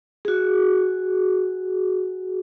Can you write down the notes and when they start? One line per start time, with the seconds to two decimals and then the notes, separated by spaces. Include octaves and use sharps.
0.25 F#4 G#4